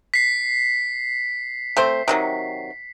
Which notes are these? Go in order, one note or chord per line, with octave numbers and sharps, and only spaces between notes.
B6 C7
A3 C4 C5
C3 D#3 F#3